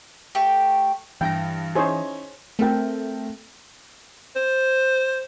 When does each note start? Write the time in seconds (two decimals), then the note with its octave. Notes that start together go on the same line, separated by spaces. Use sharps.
0.35 A3 G4
1.21 G2 E3 G5 A#6
1.75 C#4 D#4 E4 G#4 C5 C#5
2.59 A3 C4 A#4 G5
4.36 C5